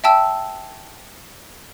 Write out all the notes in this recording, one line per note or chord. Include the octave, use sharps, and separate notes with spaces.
E5 G5 A5 E6